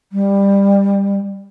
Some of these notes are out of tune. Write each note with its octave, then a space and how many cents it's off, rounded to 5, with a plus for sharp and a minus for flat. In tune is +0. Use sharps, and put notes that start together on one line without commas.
G3 +20